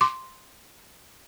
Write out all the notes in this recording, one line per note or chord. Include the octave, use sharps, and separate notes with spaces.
C6 D6